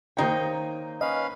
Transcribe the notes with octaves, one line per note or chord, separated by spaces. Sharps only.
D#3 A#3 D#4 C5 C#5 G5
C#4 B4 D#5 F5